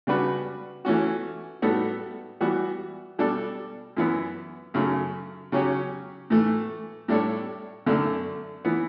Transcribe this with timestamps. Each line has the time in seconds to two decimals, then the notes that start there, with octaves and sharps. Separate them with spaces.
0.07 C#3 G3 D4 F#4 B4
0.85 E3 A3 C#4 F#4
1.62 A2 G3 B3 F#4 A4
2.41 E3 G3 B3 F#4
3.19 B2 G3 D4 A4
3.97 F#2 E3 B3
4.74 F#2 C#3 F#3 A3
5.52 C#3 F#3 C#4 G4
6.30 A2 E3 A3
7.08 A2 G3 D4 A4 C#5
7.86 F#2 D3 A3 D4
8.65 E3 B3